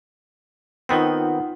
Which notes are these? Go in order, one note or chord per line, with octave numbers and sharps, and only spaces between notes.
D#3 B3 C4 D#4 F4 F#5